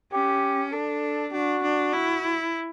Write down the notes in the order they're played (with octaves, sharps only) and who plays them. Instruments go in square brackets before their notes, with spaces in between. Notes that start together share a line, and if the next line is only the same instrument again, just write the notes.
[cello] C#4 [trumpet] G4
[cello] D4 [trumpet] A4
[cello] D4 [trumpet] F#4
[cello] D4
E4